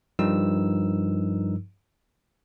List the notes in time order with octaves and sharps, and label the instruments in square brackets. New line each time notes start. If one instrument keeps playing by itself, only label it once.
[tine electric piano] G2 F3 D#4 A#4 E6